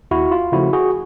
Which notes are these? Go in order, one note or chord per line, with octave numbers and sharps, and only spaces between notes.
D#2 E4 F#4
F4
C#3 F3 A3 E4 F#4
F#4 G#4